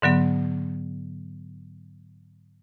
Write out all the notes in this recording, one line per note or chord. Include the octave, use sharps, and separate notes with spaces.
G#2 D3 F#3 B3